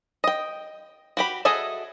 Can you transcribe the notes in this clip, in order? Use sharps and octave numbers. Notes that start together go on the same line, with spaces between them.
D#5 G5
F#4 G4 B5
F#4 G#4 A4 D#5 E5